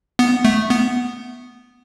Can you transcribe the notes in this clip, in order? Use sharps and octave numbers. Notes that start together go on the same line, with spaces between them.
B3
A3
B3